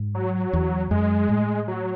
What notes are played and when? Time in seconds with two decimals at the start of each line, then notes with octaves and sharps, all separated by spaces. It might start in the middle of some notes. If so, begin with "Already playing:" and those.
Already playing: G#2
0.15 F#3
0.53 E2
0.91 F#2 G#3
1.29 A2
1.68 F#3